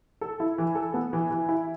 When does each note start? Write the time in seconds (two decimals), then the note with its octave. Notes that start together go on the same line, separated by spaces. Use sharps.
0.21 A4
0.40 E4
0.58 E3
0.75 A4
0.94 B3
1.13 E3
1.31 E3
1.49 E4